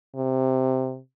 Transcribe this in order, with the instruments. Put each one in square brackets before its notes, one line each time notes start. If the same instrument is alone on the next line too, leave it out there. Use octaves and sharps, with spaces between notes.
[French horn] C3